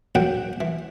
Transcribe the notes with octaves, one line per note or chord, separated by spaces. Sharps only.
A#1 F#2 A#2 F#3 F#5 G5
E3